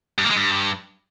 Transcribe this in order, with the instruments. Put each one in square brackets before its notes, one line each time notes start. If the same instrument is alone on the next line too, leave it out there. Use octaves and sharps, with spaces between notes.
[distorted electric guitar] G2
A#3
G#3
G2